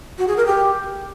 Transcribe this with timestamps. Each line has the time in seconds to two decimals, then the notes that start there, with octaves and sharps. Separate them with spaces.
0.18 F#4
0.27 G#4
0.36 A#4
0.46 G4